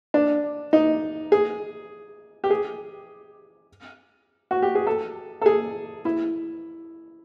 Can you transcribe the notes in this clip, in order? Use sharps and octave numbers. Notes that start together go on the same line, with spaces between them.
D4
D#4
G#4
G4
G#4
F#4
G4
G#4
A4
A4
G#4
E4